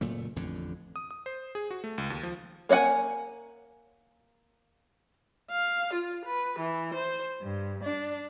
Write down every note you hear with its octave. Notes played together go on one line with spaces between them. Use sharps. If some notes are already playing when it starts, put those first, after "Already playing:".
F#1 A#2 A3
A1 F2 A2 D3
D#6
D#6
C5
G#4
F#4
A3
C#2
D#2
F3
A#3 C#5 D#5 F#5 G#5
F5
F4
B4
E3
C5
G2
D4